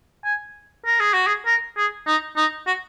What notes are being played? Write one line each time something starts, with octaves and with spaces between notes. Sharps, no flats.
G#5
A#4
G#4
F#4
G#4
A#4
G#4
D#4
D#4
F#4